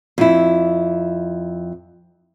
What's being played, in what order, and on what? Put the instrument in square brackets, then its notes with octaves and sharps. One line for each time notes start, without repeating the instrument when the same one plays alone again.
[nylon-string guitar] F2 E4